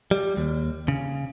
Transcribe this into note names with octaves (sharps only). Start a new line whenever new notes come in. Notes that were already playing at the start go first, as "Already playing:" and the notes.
G3
D#2
C#3